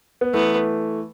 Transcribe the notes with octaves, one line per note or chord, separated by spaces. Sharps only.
B3
E3 A3 B3